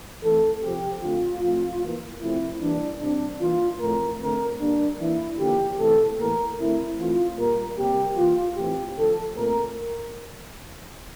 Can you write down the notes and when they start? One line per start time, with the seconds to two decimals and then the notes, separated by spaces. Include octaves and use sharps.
0.23 E3 A3 C4 A4
0.63 C3 F3 C4 G4
1.03 D3 A3 C4 F4
1.43 A2 F3 A3 C4
1.82 E3 A#3
2.22 C3 F3 A3 C4 E4
2.62 E3 G3 A#3 D4
3.01 C3 G3 C4 D4
3.40 E3 A#3 F4
3.80 A2 F3 A3 C4 A#4
4.20 D3 A3 C4 A#4
4.60 D3 G3 A#3 D4
5.00 E3 A#3 E4
5.39 D3 F3 A#3 G4
5.79 C3 E3 A3 A4
6.18 A2 E3 A#3 A#4
6.58 D3 A3 C4 E4
6.98 E3 A3 C4 F4
7.38 A#2 G3 A#3 A#4
7.77 C3 G3 A#3 G4
8.17 E3 A#3 F4
8.57 A2 E3 A3 C4 G4
8.97 D3 F3 A3 A4
9.36 A#2 A3 C4 A#4